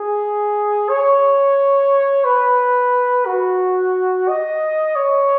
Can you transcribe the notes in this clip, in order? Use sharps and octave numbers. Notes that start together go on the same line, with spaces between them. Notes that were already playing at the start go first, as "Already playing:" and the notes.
Already playing: G#4
C#5
B4
F#4
D#5
C#5